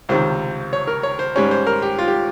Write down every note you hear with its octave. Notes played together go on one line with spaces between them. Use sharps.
C#2 C3 D#3 C5
C#5
A#4
C#5
C5
G#2 G3 C#4 C#5
C5
A#4
G4
F4
G4